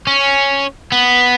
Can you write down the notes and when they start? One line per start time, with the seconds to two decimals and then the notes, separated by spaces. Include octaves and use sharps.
0.07 C#4
0.92 B3